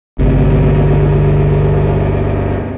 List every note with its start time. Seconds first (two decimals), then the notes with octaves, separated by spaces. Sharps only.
0.19 G1 D2 C3